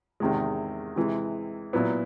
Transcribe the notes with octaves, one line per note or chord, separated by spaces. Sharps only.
E2 C3 D#3 G#3
C3 E3 G#3
A#2 F#3 B3 E4